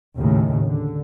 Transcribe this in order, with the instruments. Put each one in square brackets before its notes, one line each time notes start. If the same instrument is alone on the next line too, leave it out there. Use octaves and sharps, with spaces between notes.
[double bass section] D#2 A2 C#3
D3